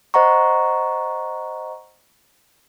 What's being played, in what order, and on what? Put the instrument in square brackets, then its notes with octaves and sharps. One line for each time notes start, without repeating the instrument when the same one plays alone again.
[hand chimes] C5 D#5 F#5 A#5 C#6